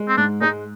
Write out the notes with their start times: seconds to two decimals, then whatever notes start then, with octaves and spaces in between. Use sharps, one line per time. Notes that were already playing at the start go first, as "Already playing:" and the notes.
Already playing: G#3
0.08 C4
0.17 G#2 D4
0.41 G#3 D#4